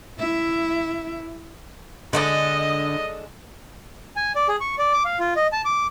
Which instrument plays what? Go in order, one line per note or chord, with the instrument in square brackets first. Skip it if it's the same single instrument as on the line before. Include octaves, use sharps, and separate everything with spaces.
[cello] E4 E5
[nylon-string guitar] D3 [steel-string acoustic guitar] G#3 D4 A4 [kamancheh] D#5
[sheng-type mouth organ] G#5
D5
G#4
C#6
D5
D6
F5
F4
D#5
A5
D6